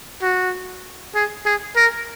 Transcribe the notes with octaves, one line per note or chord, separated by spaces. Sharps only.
F#4
G#4
G#4
A#4